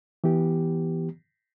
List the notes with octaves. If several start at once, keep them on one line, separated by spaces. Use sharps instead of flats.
E3 B3 G4